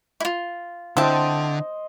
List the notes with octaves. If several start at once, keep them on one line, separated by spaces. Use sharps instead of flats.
E4 F4
D3 C4 E4 F4 C5 D#5 G5 A5